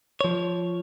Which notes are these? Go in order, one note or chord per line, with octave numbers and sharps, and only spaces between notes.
F3 C#5